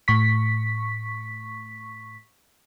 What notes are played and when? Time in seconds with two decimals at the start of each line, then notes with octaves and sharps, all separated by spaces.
0.08 A2 C#6 B6